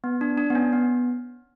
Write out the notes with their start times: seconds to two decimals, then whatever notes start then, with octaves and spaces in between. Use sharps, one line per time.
0.04 B3
0.21 D4
0.38 D4
0.50 B3
0.55 C#4
0.73 B3